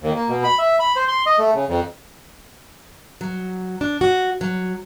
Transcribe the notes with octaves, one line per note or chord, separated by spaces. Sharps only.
D#2
A#3
B2
B5
E5
B5
C5
C6
D#5
A3
C#3
F2
F#3
D4
F#4
F#3